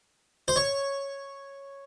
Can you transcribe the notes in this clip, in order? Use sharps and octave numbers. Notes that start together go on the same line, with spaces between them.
C5
C#5